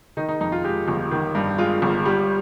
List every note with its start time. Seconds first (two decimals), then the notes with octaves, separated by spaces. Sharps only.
0.17 D#3 D#4
0.28 D#4
0.41 F2 D#4
0.52 F4
0.64 G#3 G4
0.88 G1
1.11 D#3
1.35 G2
1.58 G#3 F4
1.82 G1
2.05 G3